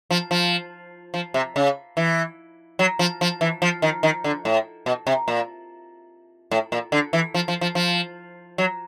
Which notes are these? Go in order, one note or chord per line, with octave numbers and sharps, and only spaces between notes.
F3
F3
F3
C3
C#3
E3
F#3
F3
F3
E3
F3
D#3
D#3
D3
A2
B2
C3
A#2
A2
A#2
D3
E3
F3
F3
F3
F3
F#3